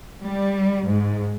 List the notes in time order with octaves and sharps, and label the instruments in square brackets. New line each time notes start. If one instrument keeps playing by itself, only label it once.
[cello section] G3
G#2